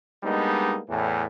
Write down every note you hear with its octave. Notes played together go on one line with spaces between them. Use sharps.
G3 G#3 A#3 B3 D4 D#4
E2 A2 E3